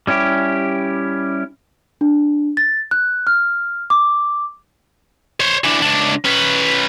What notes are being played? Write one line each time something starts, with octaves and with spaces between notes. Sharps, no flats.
G3 C#4 E4 G4
D4
A6
F#6
F6
D6
C5 C#5
E3 D4
C#2 D4
C#4 B4